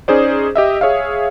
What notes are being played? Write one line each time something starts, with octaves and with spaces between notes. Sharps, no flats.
C#4 D#4 G#4 C5 D5
G4 D#5 E5
G#4 C#5 E5 F5